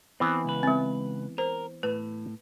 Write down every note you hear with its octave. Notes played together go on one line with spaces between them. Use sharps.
E3 B3 C4
C#2 B4
G#3 C4
A#4 C5
A2 B4